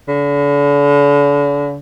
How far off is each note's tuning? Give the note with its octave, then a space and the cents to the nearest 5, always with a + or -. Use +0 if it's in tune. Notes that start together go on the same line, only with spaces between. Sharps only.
D3 -40